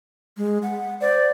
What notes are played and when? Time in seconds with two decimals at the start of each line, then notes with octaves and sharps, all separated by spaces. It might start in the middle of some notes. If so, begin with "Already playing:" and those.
0.37 G#3
0.63 F#5
1.01 C5 D5